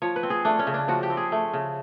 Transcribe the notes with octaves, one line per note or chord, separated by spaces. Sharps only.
F3 C#5
B4
C4
G#4
A3 D4
C#4
C#3
D4
F3 F#4
G4
C4
G#4
A3
C#3